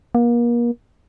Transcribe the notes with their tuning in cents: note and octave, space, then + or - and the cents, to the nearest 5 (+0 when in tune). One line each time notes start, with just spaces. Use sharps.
A#3 +35